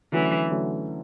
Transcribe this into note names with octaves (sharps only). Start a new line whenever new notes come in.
D3 E3 F#3 A3 C#4
D3 F#3 A3 C#4